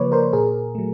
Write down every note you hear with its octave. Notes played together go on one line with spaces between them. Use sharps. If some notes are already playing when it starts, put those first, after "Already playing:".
Already playing: C#3 F3 A#3 B4 C#5 D5
A#4 C5
A#2 G#4 A#4
F#3 A3